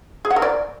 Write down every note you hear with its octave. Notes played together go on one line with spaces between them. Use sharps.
G#4
F#5
A#4
D5